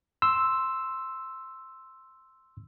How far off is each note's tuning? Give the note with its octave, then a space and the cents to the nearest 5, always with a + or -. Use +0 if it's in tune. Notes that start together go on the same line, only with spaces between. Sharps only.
C6 +0 E6 +0